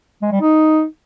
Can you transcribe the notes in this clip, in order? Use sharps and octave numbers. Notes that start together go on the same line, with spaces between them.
G#3
G3
D#4